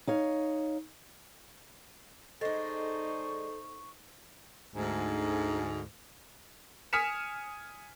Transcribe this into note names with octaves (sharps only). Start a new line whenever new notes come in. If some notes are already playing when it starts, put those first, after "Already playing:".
D#4 C#5 F5
G#3 D4 D#4 A4 C5 C#6
D2 G#2
G#5 D#6 F6 B6 C#7 E7